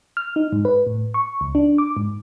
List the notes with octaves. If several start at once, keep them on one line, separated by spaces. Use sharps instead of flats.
F6
D#4
G#2
B4
A2
C#6
C#2
D4
D6
G#2